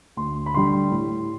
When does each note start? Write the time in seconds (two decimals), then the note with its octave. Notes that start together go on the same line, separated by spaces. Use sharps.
0.17 D2 C6
0.46 B5
0.54 D3 G3 C6
0.91 A2